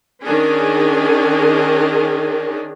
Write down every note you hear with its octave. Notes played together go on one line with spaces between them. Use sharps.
D#3 C#4 D4 G#4